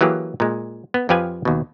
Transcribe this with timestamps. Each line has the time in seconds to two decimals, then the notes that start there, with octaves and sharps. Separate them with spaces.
0.01 E3 F#3 A#3 G4 G#4
0.40 A#2 G#3
0.94 B3
1.09 F2 F3 G4 B4 F5 G#5
1.45 D#2 B2